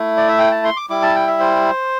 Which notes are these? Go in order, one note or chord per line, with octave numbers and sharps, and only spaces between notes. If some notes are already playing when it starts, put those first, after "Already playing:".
Already playing: A3 E4
D5
E5
G5
A5
C6
D6
G3 E4 D6
A5
G5
E5
C5